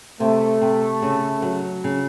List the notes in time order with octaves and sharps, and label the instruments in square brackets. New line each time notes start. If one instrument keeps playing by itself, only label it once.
[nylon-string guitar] C3 [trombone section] A3
[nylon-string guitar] C3
C#3
F#3
C#3